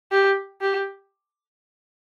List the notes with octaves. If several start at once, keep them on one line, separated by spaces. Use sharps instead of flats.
G4
G4